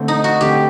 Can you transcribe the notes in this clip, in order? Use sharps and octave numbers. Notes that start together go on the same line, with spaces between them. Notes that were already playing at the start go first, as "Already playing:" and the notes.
Already playing: D3 A3 C4
D#4
F#4
D3 A3 C4 G4